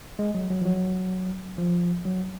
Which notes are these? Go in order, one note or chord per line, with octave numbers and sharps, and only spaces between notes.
G#3
F#3
F#3
F3
F#3
F3
F#3